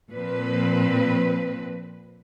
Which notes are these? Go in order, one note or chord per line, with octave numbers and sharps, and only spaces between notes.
A#2 F3 C4 B4